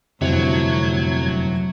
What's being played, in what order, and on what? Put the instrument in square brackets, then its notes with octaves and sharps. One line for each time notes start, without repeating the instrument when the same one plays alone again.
[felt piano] G1 C3 E3 [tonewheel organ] F2 G#6 [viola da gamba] A2 [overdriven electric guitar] F#3